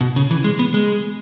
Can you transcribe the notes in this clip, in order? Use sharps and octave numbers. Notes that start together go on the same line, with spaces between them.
B2
C#3
E3
G#3
B3
G#3